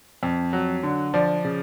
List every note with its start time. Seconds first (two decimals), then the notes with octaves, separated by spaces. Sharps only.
0.23 F2
0.53 F#3
0.83 D3
1.14 F3 D5
1.45 C#3